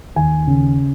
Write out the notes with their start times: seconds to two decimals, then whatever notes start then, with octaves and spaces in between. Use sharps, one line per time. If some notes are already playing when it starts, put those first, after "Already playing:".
0.16 D#2 G#5
0.47 C#3